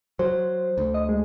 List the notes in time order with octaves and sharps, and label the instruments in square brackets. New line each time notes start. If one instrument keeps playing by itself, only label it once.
[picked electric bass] F#3 [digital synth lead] C5
[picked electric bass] D2
[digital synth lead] D#5
G#3